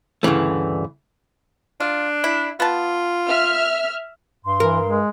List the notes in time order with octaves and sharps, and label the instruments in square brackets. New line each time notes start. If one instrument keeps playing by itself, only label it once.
[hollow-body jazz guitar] D2 G2 C#3 E3 A3
[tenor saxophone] D4 [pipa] F4
[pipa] E4
[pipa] B3 A5 [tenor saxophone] F4
[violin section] E5 F6
[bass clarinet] G2 [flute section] C6
[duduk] E3 [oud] A#4
[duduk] G#3